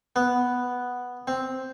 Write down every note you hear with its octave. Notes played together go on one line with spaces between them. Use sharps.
B3
C4